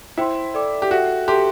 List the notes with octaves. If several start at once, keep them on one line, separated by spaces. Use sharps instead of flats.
E4 C5 G5 C6
A4 D5 G5 D6
G4
F#4 A4 E5 G5
G4 A4 E5 A5 C6